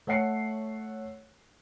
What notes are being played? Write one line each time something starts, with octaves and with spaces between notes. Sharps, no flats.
A3 C#5 F#5 C7 C#7